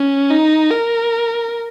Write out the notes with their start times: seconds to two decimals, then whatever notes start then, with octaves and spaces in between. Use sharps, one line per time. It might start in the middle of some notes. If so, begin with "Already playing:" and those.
Already playing: C#4
0.31 D#4
0.71 A#4